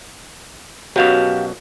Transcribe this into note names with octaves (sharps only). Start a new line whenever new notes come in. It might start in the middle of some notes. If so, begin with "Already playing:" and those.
F#2 B2 F#3 G4 F5